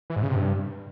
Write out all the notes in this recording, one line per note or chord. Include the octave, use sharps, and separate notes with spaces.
E3
G#2
C#3
C3
G2